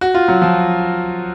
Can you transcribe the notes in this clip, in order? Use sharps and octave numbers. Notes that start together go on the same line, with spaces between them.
F#4
F4
F#3
F3